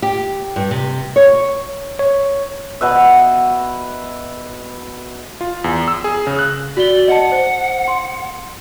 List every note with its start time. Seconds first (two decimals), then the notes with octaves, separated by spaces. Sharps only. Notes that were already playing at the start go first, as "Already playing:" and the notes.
0.02 G4
0.56 G2
0.71 C3
1.16 C#5
1.99 C#5
2.81 B2 B4 E5
5.41 F4
5.64 E2
5.88 E6
6.04 G#4
6.27 C#3
6.39 F#6
6.77 F#4 D5 G7
7.08 D#5 F#5 A5
7.32 C5
7.88 C6